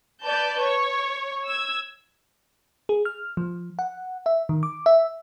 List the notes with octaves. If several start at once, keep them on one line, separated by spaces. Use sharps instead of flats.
B4 D5 A5 G6
C#5
E6 G#6
G#4
F6
F3
F#5
E5
D#3
D6
E5